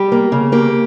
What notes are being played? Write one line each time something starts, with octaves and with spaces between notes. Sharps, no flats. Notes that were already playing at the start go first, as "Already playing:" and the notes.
Already playing: G3 G4
A#3
C#3
A#3 G4